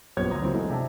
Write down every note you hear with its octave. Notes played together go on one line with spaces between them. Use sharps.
A#1 F#2 B3 G4 C#5 G#6
D2 A#5 D#6
C#2 F#3 A#3 C4 E4
E3 F#3 G#3 A3 E4 F#4
C3 D4 E5 A5